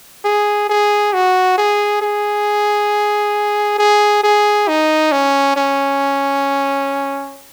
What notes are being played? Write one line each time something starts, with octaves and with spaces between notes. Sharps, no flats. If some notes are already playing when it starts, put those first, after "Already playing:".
G#4
G#4
F#4
G#4
G#4
G#4
G#4
D#4
C#4
C#4